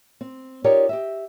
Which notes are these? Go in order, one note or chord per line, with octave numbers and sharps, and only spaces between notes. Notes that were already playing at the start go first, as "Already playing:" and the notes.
C4
D#4 F4 G4 A#4 C#5 D5
G4 D#5 E5